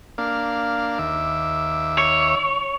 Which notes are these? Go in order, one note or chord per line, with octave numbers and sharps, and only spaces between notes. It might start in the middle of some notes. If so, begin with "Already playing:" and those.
A#3 D4 F5
D#2 E5 D6
C#5